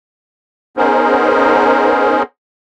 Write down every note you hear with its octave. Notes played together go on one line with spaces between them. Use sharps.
B3 C#4 D#4 G#4 A#4 C5